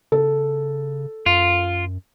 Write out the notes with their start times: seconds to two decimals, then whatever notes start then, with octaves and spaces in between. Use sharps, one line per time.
0.12 C#3 A4
1.26 F#2 F4